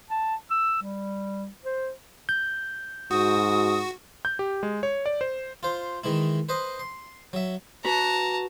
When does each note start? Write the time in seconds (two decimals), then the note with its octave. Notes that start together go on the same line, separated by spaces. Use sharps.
0.10 A5
0.51 E6
0.83 G3
1.65 C5
2.29 G6
3.11 G#2 F#4 D#6
4.25 G6
4.39 G4
4.63 G#3
4.83 C#5
5.06 D5
5.21 C5
5.63 F4 C5
6.04 D#3 E3 G#3 E4
6.49 B4 C5 D#5
6.80 C6
7.33 F#3 E5
7.85 F#4 B4 A5 A#5